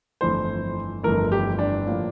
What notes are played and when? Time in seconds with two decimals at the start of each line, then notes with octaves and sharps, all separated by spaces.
0.21 G1 F2 E3 A3 C5
1.03 G1 F2 E3 A3 A#4
1.32 G4
1.59 D4
1.86 A2 F3 A#3